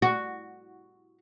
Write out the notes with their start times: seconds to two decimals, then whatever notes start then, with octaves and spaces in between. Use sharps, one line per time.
0.02 F#4